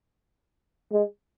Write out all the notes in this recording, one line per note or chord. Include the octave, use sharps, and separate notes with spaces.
G#3